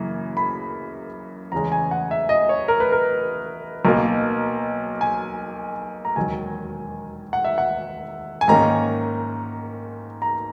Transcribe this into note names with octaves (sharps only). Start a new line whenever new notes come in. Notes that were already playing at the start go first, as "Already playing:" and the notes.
Already playing: F#2 C#3 E3 A#3
B5
E2 C#3 G#3 C#4 A#5
G#5
F#5
E5
D#5
C#5
A#4
B4
A#4
B1 B2 A#3 A#4
G#5
A#5
E1 D#2 D#3 F#3 G#5
F#5
E5
F#5
G#5
G#2 D#3 A#3 C#4 A#5
A#5